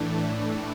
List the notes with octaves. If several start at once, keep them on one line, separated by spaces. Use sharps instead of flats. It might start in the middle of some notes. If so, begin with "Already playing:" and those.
Already playing: A2 E3 A3 D4